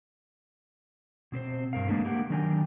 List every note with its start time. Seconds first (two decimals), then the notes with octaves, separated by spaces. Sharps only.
1.32 B2 C4 B4 C5
1.73 G2 A#4 F5
1.88 G#3 A#3 D4 A4 B4
2.05 A#3 G4 A#4 F#5
2.30 D#3 F#3 D4 A#4 G5 G#5